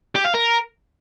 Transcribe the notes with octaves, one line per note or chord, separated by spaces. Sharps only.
G4
F5
A#4